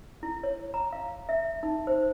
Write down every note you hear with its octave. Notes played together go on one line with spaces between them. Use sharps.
E4
C#5
A#5
F5
E5
D#4
C5